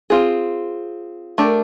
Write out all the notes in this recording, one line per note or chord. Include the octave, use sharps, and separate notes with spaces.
C4 F4 G#4
A3 D4 G4 A#4